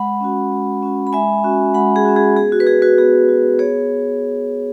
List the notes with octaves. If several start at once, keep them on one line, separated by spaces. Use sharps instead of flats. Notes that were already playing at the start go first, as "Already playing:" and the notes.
Already playing: G#3 F#5 B5
C#4 F#4
G#3
C#4 F#4
B5
G#3 E5 G#5
C#4 F#4
G#3 F#5 B5
G#4
C#4 F#4
G#4
B3 G#4
F#4
B4
F#4 G#4
F#4 B4
B3 G#4
F#4
B3 G#4 C#5